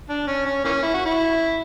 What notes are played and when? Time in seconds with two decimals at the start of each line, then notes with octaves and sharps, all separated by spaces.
0.09 D4
0.27 C#4
0.46 C#4
0.64 E3 A#3 C#4
0.82 E4
0.94 F#4
1.05 E4